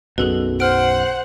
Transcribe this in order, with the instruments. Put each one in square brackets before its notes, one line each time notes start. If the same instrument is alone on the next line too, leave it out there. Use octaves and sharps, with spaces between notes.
[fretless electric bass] B1 F#2 B2 [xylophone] G#4 A4 B4
[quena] C5 [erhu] F#5 [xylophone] F6 D7